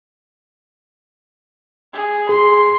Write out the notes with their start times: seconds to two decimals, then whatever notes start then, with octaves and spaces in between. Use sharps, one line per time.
1.94 G#4
2.29 G#4 C6